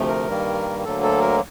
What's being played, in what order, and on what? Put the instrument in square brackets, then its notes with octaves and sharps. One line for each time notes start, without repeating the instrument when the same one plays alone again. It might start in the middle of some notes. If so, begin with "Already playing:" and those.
Already playing: [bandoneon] D2 C3 F3 A3
A#4
G2 D#3 G3 A#3
D2 D3 F#3 A#3 A4
A4
A#4